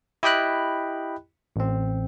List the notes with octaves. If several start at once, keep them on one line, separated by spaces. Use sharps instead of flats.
E4 G4 D#5 G5 B5 F#6
A1 C4